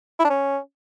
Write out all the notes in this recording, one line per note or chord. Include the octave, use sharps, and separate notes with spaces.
E4
D4
C#4